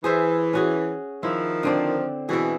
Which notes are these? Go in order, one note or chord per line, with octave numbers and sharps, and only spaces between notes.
E3 G#4 C5 E5
C#4 F#4 G#4
D#3 F3 E4
D3 C4 D4
B2 E3 E4 G#4